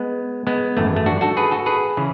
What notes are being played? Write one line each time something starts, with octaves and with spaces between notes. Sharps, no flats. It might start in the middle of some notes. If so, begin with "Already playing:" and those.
Already playing: G#3 B3
G#3 B3
G#1 F#2 E3 A3
A3
D4 F#4
F#4 A4
G#4 B4
F#4 A4
G#4 B4
C#3 E3